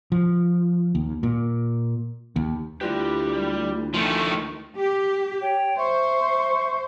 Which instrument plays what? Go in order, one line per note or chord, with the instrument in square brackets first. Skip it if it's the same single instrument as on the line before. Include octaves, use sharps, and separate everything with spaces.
[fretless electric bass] F3
D#2
A#2
D#2
[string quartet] D2 [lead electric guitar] G3 G4 [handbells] E4 F4 B4
[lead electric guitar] D#3 [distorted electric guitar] F3 A3
[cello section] G4
[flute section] C#5 G5
[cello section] C5 [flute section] E5 C#6